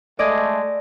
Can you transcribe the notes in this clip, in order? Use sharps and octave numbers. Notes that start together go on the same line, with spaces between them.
G#3 A3 D5 D#5 G#6